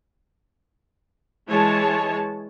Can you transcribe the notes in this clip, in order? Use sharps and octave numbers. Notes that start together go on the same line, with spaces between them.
E3 G#3 G#4 C#5 A5